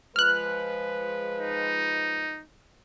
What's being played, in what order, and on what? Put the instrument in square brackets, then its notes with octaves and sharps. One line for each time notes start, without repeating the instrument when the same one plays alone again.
[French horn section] F3 G#3 B4 [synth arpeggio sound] F6 F#6
[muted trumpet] D#4